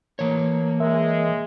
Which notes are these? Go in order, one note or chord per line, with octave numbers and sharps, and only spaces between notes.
E3 A#3 C#5
G#3 A#4 E5